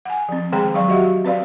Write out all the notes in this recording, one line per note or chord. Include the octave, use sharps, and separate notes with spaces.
F#5 G#5
F3 C4
D#3 G#3 G#4 G5 A#5
F#3 D5 F5 C#6
F#4 G4 D#5 E5 F#5
C4 B4 D5 F5